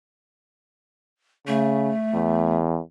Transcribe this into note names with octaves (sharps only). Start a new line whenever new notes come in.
C#3 A3
E2